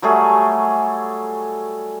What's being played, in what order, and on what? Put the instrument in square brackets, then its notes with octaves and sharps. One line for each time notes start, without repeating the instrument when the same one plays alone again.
[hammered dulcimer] F#3 G3 A3 G#4